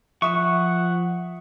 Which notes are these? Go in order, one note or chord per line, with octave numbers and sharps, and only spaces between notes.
F3 E5 F#5 C#6 D#6 E7